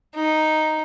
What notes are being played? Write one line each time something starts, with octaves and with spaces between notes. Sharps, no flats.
D#4